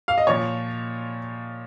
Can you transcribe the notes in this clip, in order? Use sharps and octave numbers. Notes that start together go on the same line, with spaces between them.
F5
D#5
A#2 F3 C#5